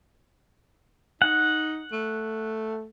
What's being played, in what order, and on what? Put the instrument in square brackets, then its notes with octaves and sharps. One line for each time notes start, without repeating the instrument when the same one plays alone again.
[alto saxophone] D#4 [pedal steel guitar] F#5
[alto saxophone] A3